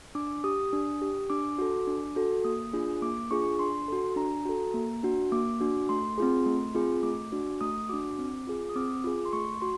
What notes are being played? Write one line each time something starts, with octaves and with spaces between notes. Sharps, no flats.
D4 D6
G4 D#6
D4
G4
D4 D6
F#4 A4
D4
F#4 A4
A#3 D#6
D4 F4 G#4
A#3 D6
D4 F4 G#4 C#6
D4 C6
F#4 A4
D4 A#5
F#4 A4
A#3
D4 F#4
A#3 D6
D4 F#4
A3 C6
C4 F4 G#4
A3
C4 F4 G#4
A3 D6
D4 F#4
A3 D#6
D4 F#4 D6
C4
F4 G#4
D#6
C4 D6
F4 G#4
C6
A3 C#6
F#4 C6